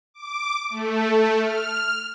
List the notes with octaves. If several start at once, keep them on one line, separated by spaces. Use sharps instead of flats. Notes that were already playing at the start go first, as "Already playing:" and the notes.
D6
A3
F6